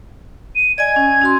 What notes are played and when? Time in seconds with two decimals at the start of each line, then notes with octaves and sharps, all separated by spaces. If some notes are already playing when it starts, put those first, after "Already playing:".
0.56 D#7
0.78 D5 D#5 G#5 G#6
0.96 C#4 G#5
1.22 C#4 F#4 C6